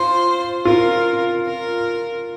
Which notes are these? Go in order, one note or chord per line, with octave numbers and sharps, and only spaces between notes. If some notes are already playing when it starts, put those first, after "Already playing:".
Already playing: F4 C5
F4 A#4
A#4